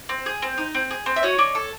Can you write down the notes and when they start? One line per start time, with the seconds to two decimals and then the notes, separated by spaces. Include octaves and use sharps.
0.09 C4
0.26 G#4
0.42 C4
0.58 D#4
0.75 C4
0.91 G#4
1.06 C4
1.16 E5
1.23 F#4 C#5 D#5
1.38 D4
1.55 A4